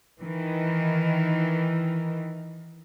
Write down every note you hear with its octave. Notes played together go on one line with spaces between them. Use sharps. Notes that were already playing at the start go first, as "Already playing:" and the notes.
D#3 E3